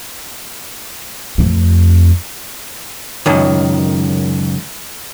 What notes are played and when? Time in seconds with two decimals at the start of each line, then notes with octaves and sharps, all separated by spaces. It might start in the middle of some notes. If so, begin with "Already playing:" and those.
1.38 F2 A3
3.26 C#2 F#2 D#3